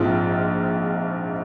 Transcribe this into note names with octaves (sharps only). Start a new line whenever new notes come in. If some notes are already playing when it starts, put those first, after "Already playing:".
Already playing: A#1 G#2 F3 C4 F4